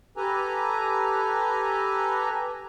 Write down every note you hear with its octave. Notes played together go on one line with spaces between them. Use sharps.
G4 A4 B4 G#5 A#5